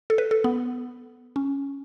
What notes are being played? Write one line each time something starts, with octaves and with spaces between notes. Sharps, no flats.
A4
B4
A4
B3
C#4